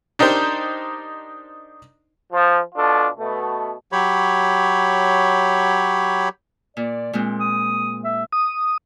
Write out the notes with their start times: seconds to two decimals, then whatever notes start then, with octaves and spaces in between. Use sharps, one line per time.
0.19 D4 D#4 G4 A#4 C5
2.33 F3
2.75 B2 D4 F4 A4
3.19 B2 A3
3.92 F#3 G4 C#5 B5
6.77 A#2 D5
7.13 A#2 G#3 C4
7.40 D#6
8.04 E5
8.33 D#6